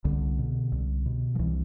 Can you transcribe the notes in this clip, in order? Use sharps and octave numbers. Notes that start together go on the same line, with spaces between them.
C2 D3
B2
C2
B2
F3
C2 E3